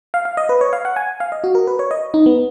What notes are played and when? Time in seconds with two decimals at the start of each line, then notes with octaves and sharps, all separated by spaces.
0.14 F5
0.25 F5
0.37 D#5
0.49 B4
0.61 C#5
0.73 F5
0.85 F#5
0.96 G#5
1.20 F5
1.32 D#5
1.44 F#4
1.55 A#4
1.67 B4
1.79 C#5
1.91 D#5
2.14 D#4
2.26 B3